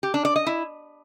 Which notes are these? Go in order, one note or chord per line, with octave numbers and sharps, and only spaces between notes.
G4
D4
D5
D#5
E4